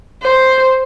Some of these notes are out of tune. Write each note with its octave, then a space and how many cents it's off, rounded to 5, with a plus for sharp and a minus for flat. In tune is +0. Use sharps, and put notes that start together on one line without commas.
C5 +0